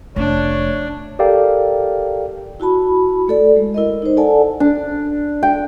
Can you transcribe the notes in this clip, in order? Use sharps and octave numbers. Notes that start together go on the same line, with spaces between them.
F1 A3 D4 C#5
G4 A4 A#4 D5 F5 G5
E4 F#4 A5 B5
A3 A4 D5
G#3
E4 A#4 D#5
D#4 C5
A4 D5 F#5 G#5 A5
D4
G5